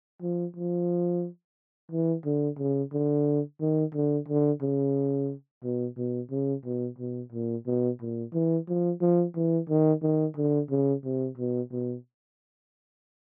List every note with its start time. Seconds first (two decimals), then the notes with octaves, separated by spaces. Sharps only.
0.22 F3
0.56 F3
1.91 E3
2.25 D3
2.59 C#3
2.93 D3
3.61 D#3
3.95 D3
4.28 D3
4.62 C#3
5.64 B2
5.98 B2
6.31 C#3
6.65 B2
6.98 B2
7.33 A#2
7.66 B2
8.00 A#2
8.34 E3
8.68 F3
9.01 F3
9.36 E3
9.69 D#3
10.03 D#3
10.37 D3
10.71 C#3
11.05 C3
11.38 B2
11.72 B2